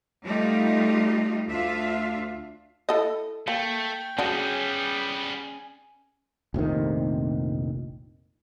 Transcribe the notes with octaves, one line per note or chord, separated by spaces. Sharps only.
G3 A3 D#4 F4 G4
D2 D4 F4 E5 F5
E4 A4 D#5
A3 A#3 G5
F#3 G3 B3 C#4 D4 G#4
F1 A#1 C3 D#3